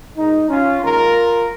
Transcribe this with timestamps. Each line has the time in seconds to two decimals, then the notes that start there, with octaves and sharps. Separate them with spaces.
0.16 A#2 G#3 D#4
0.49 C#4 F4
0.82 G#2 D#3 A#3 F4 A#4